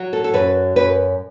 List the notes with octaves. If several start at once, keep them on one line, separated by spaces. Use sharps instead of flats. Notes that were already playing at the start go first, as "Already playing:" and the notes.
Already playing: F#3
A4
A4
F#2 B4
F#2 B4